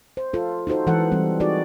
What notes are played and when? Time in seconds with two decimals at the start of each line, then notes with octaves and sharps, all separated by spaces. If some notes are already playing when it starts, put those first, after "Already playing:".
0.17 C5
0.33 F4 A4
0.67 D#4 F#4 A4 C5
0.87 E3 G#3 A4 F#5
1.12 E3 G3 C4
1.40 D#4 F#4 G#4 D5